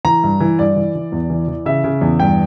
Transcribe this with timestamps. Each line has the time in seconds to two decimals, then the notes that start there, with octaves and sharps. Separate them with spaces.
0.05 E3 A#5
0.24 G2
0.40 E3
0.59 G2 D5
0.76 E3
0.95 E3
1.12 E2
1.30 E3
1.48 E3
1.66 C#3 E5
1.84 C#3
2.01 E2
2.20 G2 G5